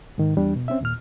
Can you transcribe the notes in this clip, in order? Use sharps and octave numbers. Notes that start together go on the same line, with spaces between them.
G#2 D#3
E2 G3 D4
B2
C4 C#4 E5
D#2 A#2 F6